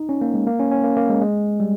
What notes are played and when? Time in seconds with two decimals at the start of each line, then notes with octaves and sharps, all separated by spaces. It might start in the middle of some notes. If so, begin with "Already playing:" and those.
Already playing: D#4
0.09 C#4
0.21 A#3
0.34 G#3
0.47 A#3
0.59 C#4
0.71 C#4
0.84 A#3
0.97 A#3
1.09 G#3
1.21 G#3
1.60 G3